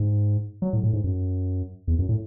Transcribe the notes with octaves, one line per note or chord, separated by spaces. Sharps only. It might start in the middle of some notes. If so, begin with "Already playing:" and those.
Already playing: G#2
F#3
A2
A2
G#2
F#2
E2
F#2
A2